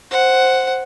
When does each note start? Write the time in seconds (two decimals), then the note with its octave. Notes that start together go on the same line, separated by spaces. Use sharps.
0.11 C5 F#5